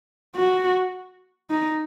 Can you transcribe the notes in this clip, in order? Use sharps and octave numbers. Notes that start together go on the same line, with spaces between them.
F#4
D#4